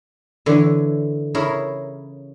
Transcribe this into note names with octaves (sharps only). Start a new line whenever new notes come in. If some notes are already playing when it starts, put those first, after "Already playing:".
D3 E3 C#5
C#3 E4 A#4 C#5